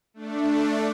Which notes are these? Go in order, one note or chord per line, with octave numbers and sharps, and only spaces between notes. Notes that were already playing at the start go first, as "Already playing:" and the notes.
A3 D4